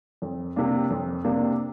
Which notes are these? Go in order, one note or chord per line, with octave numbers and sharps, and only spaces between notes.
F2
C3 A#3 D4
F2
C3 A#3 D4